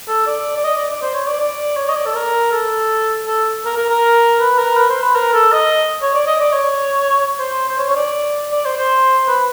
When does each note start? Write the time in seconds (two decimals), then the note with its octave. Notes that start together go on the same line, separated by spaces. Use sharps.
0.08 A4
0.27 D5
0.56 D5
0.64 D#5
0.77 D5
0.90 D5
1.02 C5
1.14 C#5
1.27 D5
1.40 D5
1.77 C#5
1.89 D#5
1.96 D5
2.06 A4
2.15 A#4
2.52 A4
3.27 A4
3.65 A#4
3.77 A#4
3.89 A#4
4.40 B4
4.59 A#4
4.77 B4
4.90 C5
5.02 B4
5.15 A#4
5.33 A4
5.52 D#5
6.02 C#5
6.14 D5
6.27 D#5
6.40 D5
6.53 C#5
7.40 C5
7.69 C5
7.78 C#5
7.89 C#5
7.96 D5
8.52 D5
8.66 C5
8.77 C5
9.28 B4